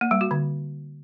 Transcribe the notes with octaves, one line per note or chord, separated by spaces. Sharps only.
A#3
G3
F#4
D3